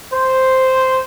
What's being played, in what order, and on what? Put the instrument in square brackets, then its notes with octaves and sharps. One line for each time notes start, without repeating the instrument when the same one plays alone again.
[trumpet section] C5